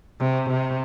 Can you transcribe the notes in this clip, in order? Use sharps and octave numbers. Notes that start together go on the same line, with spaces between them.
C3
C3